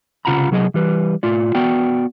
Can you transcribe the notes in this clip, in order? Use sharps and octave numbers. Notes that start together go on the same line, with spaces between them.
C2 C#3 F4 F#5 A#5 B5
C2 F#3 G#4 D#5
E3 G3 B4
A2 F4 D5
B3 F#4 D5 G5